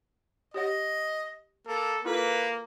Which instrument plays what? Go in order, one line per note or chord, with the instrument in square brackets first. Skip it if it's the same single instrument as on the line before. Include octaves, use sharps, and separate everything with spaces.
[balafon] G4 C#5 F#5 [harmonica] D#5
[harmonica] A#3 [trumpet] A4
[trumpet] A#3 [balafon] E4 F4 A4 [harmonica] B4